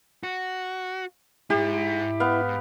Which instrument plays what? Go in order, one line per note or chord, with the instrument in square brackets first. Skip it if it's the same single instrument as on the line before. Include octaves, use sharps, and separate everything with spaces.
[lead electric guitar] F#4
[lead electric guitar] G#2 G#3 [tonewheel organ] E4 [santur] G4
[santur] B3 F5